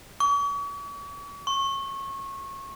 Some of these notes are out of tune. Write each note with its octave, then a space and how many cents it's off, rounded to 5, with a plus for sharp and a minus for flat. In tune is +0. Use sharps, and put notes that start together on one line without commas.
C#6 +40
C#6 -25